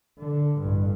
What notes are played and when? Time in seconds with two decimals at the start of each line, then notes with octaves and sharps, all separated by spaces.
0.19 D3
0.60 A1 G2